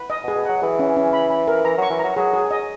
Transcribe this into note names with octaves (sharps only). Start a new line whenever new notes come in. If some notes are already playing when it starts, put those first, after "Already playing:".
Already playing: B4
D#5
B2
G#4
B2
F#3 F#5
E3 G#4
C#4
C#4
B5
B5
A#4
E3 A#5
F#3 C#6
E3
F#3 A#5
F#3 G#4
G#4
D#5